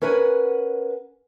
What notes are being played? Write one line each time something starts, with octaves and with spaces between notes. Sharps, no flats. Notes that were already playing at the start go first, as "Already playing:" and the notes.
C#4 A#4 B4 F#5 G#5